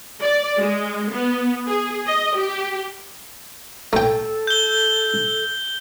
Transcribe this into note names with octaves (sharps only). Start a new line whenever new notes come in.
D5
G#3
B3
G#4
D#5
G4
A3 A4 G5
G6 G7